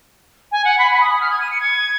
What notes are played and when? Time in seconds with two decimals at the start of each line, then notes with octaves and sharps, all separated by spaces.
0.52 G#5
0.65 F#5
0.79 B5
0.91 B5
1.01 D#6
1.11 D#6
1.21 F6
1.31 G#6
1.41 D#7
1.51 C#7
1.61 G#6